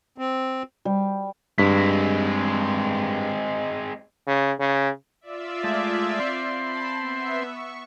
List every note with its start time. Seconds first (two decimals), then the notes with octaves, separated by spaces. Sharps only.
0.18 C4
0.85 G3
1.58 G2 G#3 C4 B6
4.27 C#3
4.60 C#3
5.21 F4 D5 E5
5.64 G#3 A3
6.20 C4 C6
6.58 A5 B5
6.99 B3 E5
7.41 C#6